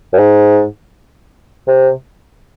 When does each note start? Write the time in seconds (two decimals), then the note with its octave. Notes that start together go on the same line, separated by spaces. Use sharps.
0.13 F#2
0.19 G#2
1.68 C3